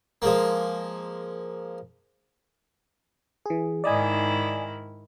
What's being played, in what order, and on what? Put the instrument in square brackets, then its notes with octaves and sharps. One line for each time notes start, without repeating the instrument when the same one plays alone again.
[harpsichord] F3 G#3 A#3
[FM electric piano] E3 G#4
[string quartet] G#2 D#3 E4 [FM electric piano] D5 D#5 G#5